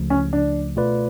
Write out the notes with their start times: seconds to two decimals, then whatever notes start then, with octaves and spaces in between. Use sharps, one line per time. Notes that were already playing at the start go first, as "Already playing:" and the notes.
Already playing: C#2 C#3 F3 A3
0.10 C#4
0.33 D4
0.76 B2 A3 F4 B4 D5